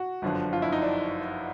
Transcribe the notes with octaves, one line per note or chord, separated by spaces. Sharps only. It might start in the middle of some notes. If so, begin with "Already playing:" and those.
Already playing: F#4
G1 F#2 D3 F3
F4
E4
D#4
D4